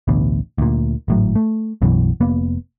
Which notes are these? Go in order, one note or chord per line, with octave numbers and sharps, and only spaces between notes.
A1 D2 B2
D2 A#2
G#1 A2 F#3
A3
B1 F#2 B2 E3
F1 A#3 B3